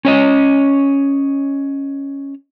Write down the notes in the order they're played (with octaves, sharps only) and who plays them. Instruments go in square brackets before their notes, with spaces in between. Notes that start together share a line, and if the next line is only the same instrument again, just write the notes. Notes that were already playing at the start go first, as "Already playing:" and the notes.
[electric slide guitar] C#4 C#5 D#5